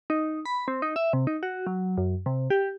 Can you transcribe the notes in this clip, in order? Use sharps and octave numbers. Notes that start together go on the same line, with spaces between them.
D#4
B5
C4
D#4
E5
C3
D#4
F#4
F#3
F#2
C3
G4